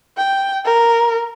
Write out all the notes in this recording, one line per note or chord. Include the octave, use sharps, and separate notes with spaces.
G5
A#4